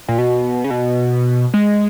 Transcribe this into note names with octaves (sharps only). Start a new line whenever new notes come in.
A#2
B2
C#3
B2
G#3